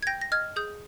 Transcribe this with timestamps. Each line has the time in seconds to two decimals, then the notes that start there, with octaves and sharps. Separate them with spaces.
0.03 G#6
0.07 G5 G6 A#6
0.21 A#6
0.32 D#5 F6 G#6
0.56 G#4 D#6 G6